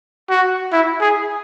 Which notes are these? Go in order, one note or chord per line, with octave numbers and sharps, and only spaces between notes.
F#4
E4
G#4